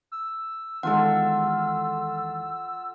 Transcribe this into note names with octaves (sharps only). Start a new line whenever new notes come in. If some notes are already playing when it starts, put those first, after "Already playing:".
E6
E2 D#3 G#3 F4 A4 F#5